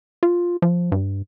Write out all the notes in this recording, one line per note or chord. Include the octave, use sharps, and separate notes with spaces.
F4
F3
G2